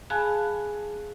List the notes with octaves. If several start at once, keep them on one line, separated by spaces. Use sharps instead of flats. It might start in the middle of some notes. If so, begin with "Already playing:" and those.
G#4 F5 G#5 A5 B5 F#6